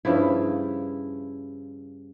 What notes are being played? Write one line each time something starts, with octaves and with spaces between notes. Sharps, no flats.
G2 C#3 F3 E4